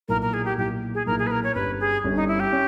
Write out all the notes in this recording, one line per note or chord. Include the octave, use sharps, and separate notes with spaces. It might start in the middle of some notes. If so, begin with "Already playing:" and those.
B1 A#2 A#3 E4 A#4
A#4
G#4
G4
B1 A#2 A#3 E4 G4
G#4
B1 A#2 A#3 E4 A#4
G#4
B4
A#4
C#5
G1 G2 G3 C#4 B4
G#4
G1 G2 G3 C#4
D#4
E4
G4
C#4